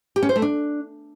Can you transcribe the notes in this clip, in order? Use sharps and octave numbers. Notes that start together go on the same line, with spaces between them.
G4
C#4
C5
A3
D4